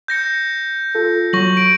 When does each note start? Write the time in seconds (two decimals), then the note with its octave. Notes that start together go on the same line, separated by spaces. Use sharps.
0.08 G6 A#6 C#7
0.95 F4 A4
1.33 F#3 C#6 A#6 F#7
1.57 D7